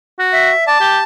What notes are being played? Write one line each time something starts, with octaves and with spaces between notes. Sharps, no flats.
F#4
E5
D5 A5
G4